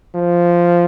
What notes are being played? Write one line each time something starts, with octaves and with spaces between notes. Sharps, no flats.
F3